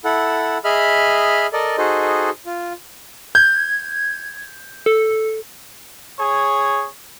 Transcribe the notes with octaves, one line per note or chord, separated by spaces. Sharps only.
E4 A4 F#5
G#4 D#5 E5 B5 F6
A4 A#4 D5 D#5
D#4 F#4 G#4 A4 C5 D#5
F4
G6 G#6
A4
G#4 C#5